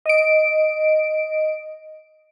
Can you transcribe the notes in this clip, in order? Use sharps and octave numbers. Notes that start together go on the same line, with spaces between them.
D#5 D7